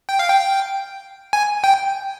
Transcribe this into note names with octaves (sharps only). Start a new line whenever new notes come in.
G5
F5
G5
G#5
G5